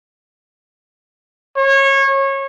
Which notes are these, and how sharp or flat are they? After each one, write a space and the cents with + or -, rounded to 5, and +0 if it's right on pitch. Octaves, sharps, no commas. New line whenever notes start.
C#5 -25